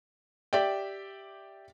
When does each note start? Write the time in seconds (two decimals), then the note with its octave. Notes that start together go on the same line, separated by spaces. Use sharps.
0.53 G4 D5 E5 G5